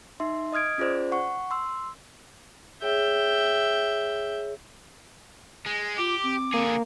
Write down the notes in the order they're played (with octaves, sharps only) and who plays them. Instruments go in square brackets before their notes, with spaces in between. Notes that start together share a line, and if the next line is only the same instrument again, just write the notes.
[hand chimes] D#4 E5 C6
D#5 D#6 F6 G#6 D7
C#4 F4 G#4 C5 D5
F#5 C#6
C6 E6
[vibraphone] G#4 C#5 [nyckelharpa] E5 G5
[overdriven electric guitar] G#3
[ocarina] F4 [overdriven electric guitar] G4 [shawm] D6
[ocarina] C4
[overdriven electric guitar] D3 G#4 [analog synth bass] A#3